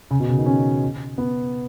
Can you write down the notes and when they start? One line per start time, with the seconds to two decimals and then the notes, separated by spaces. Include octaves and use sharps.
0.11 C#3
0.20 B2
0.29 C#3
0.37 D#3
0.46 C#4
1.18 B3